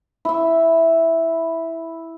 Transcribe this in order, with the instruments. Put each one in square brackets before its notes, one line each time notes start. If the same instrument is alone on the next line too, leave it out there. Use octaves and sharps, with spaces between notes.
[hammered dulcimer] E4 E5